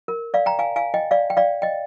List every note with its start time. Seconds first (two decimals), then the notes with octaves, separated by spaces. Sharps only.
0.08 A#4
0.34 D5 F5
0.46 G5 A#5
0.59 F5 G#5
0.76 F5 G#5
0.94 D#5 G5
1.11 D5 F5
1.30 G5
1.37 D5 F5
1.62 D#5 G5